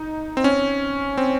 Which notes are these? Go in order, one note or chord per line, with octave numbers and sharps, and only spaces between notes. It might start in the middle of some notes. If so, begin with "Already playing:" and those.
Already playing: D#4
C4
C#4
C4